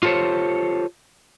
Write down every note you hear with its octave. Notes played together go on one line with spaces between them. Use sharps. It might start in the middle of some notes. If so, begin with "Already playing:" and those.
F4 G4 A4 C5 C#5